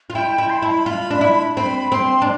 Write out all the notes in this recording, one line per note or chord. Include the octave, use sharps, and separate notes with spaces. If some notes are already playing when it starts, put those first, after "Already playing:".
F4
E4 G5
E4
C6
B5
E4 A5
B5
F4
D4
E4
C4 B5
C4 C6
D4